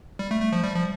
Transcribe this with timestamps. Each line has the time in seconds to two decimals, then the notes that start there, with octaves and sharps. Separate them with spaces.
0.19 G3
0.31 A3
0.41 A3
0.53 F3
0.63 G3
0.75 F3